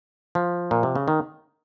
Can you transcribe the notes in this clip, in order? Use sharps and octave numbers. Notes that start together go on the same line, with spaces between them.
F3
A#2
C3
C#3
D#3